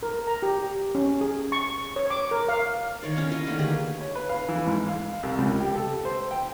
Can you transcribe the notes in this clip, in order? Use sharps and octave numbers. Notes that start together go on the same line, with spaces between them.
A#4
A#5
G4
C#4
G#4
C#6
C#5
D6
A#4
F5
D#3 C#5 D5
C#4 E4 F5
A#4 D#5 F5
D3 D#3 A3 A#3
G4 G#4 B4
C#5
B4
F5
E3
G#2
F5
C2
C#2
G4
A4
C5
G5